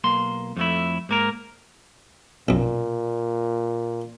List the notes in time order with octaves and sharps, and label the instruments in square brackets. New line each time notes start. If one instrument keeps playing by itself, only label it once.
[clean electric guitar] B1 A#3 C6
F2 A3 E4
G#2 A#3 A#4
[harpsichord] B1 F#2 [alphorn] A#2